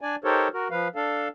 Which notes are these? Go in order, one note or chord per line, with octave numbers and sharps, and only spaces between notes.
D4 D5 G#5
D#4 G4 A4 A#4 C5 C#5
F#4 A#4
F3 B4 F5
D4 A4 F5